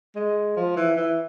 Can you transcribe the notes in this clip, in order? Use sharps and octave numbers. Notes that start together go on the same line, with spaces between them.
G#3
F3
E3
E3